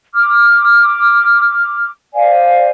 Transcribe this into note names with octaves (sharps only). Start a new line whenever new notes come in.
D6 F6
C5 D5 F5 G#5